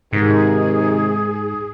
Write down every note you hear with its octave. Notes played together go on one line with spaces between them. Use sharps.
G#2 C3 D#3 G#4